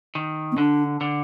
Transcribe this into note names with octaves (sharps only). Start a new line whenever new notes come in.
D#3
B3
D3 D4
D3